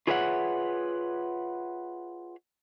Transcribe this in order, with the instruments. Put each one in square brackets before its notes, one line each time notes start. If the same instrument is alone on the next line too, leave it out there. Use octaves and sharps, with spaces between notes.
[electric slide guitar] F4 G#4 B4 C#5 E5 F#5